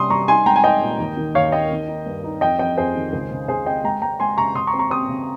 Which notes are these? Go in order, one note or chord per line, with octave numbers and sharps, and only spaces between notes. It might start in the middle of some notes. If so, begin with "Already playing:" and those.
Already playing: C3 G3 C#4 C6 D#6
G3 A#5 C#6
D#4 G#5 C6
G#3 G5 A#5
G#5
D#4 D#5 G5
A#2
D#2
D#3
D#2 C#5 F5
A#3 D#5 G5
D#3
D#4
G2
D#4
F2 D#5 G5
F2 D#5 G5
F2 G#4 C5
D#3
C#2
C#3
C#3 G#4 C5
C4 D#5 G5
G#3 G5 A#5
G#3 G5 A#5
G#3 G#5 C6
C#3 A#5 C#6
C#3 C6 D#6
A#5 C#6
C4
A#5 C#6
C4 C6 D#6
C#3